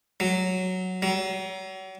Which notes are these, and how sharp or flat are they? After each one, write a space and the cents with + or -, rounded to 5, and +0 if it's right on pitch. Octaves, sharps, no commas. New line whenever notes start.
F#3 +0
F#3 +40